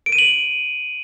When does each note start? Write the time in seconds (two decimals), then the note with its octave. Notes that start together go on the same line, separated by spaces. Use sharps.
0.06 D7
0.12 D#7
0.19 F#7